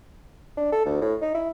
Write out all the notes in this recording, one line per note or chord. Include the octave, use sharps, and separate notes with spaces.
D4
A4
D2
A2
D#4
E4